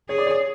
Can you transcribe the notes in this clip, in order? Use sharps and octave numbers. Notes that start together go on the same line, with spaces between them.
G#4 C#5
D5
C#5